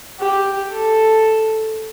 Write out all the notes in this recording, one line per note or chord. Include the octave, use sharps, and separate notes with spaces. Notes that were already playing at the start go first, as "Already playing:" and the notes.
G4
A4